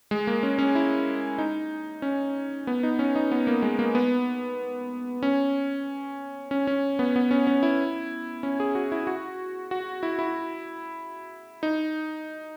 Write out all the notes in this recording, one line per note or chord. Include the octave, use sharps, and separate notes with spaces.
G#3
A#3
C#4
C#4
E4
D#4
C#4
B3
D#4
C#4
D#4
B3
A#3
G#3
A#3
B3
C#4
C#4
C#4
B3
B3
C#4
C#4
E4
C#4
G#4
F#4
E4
F#4
F#4
E4
E4
D#4